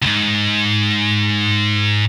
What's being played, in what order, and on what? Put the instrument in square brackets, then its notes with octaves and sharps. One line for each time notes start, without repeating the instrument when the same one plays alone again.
[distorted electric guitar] C#2 G#2